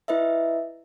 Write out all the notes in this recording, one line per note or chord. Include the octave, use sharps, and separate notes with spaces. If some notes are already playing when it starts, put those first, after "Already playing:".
E4 B4 D#5 E5